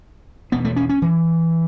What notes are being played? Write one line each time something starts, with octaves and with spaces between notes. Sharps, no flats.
E1 E2 B2 B3
A3
C#4
C#4
E3